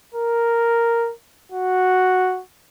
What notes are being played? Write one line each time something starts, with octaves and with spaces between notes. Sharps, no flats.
A#4
F#4